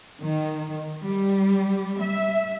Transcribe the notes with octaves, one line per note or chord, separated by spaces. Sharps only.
D#3
G3
E5